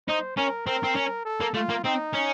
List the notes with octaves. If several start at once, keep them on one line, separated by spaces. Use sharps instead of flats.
D#4 C5
C#4 A#4
C4 A#4
C4
C#4
A4
A#3
A3 F4
A#3
C4 D#4
C#4